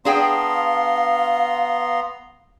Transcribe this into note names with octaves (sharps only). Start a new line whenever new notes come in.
B3 D4 G#4 F5 G5 A#5 C6